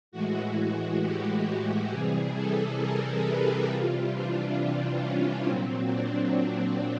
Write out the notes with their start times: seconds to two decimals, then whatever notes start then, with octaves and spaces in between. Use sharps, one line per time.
0.12 A2 E3 G#3 F#4
1.01 G4
1.90 C3 E3 G3 G#4
2.35 A4
2.80 A#4
3.24 B4
3.68 C3 E3 G3 F4
4.13 D4
5.02 C#4
5.46 A#2 F#3 C4
5.91 D4